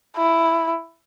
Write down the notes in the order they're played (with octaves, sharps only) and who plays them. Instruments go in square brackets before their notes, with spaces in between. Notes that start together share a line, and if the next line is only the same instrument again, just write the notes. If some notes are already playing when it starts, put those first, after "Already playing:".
[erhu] E4